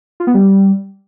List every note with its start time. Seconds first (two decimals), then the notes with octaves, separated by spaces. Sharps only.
0.20 F4
0.27 B3
0.34 G3